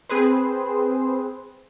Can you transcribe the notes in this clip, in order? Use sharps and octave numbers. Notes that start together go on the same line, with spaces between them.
C4 G#4 B4 C5